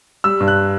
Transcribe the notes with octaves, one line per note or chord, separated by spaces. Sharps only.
G3 E6
G2
F#6